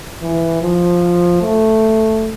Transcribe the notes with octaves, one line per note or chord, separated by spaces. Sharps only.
E3
F3
A3